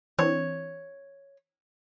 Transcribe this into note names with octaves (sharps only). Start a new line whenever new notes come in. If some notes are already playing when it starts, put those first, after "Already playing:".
E3 C4 D4 C#5